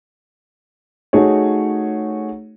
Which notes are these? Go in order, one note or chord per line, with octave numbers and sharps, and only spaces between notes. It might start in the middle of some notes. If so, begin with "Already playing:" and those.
A3 D#4 F#4 G#4 C#5